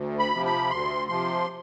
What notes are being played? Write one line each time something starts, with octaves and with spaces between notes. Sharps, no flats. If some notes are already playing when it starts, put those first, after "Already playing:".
Already playing: D2
B5
C3 F3
B5
D2 C6
C3 F3 C6